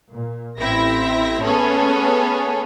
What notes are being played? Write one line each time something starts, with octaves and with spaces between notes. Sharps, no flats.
A#2
A1 C4 E4 E5 A#6
A3 B3 C#4 G#4 A4 C#5